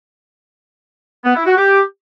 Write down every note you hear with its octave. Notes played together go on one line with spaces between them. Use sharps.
B3
E4
F#4
G4